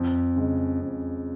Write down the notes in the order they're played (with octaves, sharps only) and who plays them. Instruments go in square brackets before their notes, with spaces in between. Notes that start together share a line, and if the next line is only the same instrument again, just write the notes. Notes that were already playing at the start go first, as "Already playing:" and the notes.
Already playing: [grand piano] F2
C#3 G#3
F2